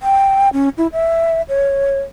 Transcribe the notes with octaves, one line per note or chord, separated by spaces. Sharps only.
G5
C#4
E4
E5
C#5